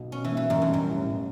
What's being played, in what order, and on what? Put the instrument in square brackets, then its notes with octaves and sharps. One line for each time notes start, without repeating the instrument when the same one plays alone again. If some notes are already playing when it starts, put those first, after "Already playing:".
Already playing: [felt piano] B1 B2
[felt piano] B2 [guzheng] C#4
[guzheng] E3
[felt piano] B1
[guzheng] E3
[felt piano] A1 [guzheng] F#2
[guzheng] G2
[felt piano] G3
[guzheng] F#2
[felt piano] A2
A2